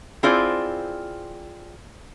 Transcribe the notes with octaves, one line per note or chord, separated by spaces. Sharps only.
C4 E4 F4 G#4 C5 D5